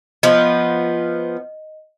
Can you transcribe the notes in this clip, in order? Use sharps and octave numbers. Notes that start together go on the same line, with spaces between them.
F3 B3 D#5